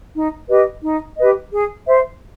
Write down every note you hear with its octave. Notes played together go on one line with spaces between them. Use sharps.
D#4
G4 B4 D#5
D#4
G4 B4 D#5
G#4
C5 E5